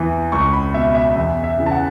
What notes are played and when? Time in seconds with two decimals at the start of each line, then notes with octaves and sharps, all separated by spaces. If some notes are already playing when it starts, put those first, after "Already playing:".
Already playing: E2 E3
0.32 C#2 C#6
0.53 B5
0.74 B2 E5
0.95 E5
1.16 E2 E5
1.44 E5
1.58 C#3 E3
1.66 A5
1.71 F#5